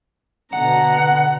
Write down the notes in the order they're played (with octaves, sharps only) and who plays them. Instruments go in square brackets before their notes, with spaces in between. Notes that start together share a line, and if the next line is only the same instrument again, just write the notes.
[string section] B2 D3 [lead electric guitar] F#5 [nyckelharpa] A#5